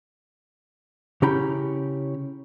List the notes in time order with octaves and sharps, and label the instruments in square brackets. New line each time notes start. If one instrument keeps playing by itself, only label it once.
[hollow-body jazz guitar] C#3 C#4 E4 G4 A#5 B5